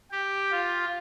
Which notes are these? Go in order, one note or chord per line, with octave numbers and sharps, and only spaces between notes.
G4
F4